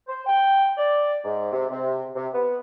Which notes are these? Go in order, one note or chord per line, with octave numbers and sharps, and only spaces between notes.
C5
G5
D5
G#2
C3
C3
C3
B3